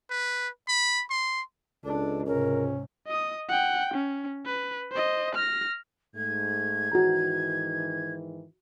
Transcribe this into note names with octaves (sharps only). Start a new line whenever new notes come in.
B4
B5
C6
C#2 D4 A4
G#2 C3 C#4 A#4
D#5 D#6
F#5 G5
C#4
B4
C5 D#5
F6 A#6
G#2 A3 G#6
G#2 D#3 E3 F#4 G#4 A#5